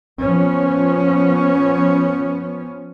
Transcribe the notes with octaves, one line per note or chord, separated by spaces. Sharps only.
F3 B3 C#4